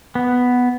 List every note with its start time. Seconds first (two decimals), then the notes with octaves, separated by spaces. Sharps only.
0.15 B3